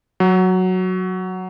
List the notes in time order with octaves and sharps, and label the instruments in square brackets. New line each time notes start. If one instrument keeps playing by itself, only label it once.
[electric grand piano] F#3